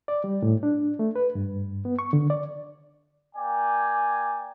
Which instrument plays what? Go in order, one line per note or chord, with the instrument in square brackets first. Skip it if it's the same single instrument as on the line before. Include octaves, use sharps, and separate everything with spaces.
[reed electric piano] D5
G3
A2
D4
A3
B4
G2
B3
C#6
D3
D5
[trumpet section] A#3 D5 G5 G#5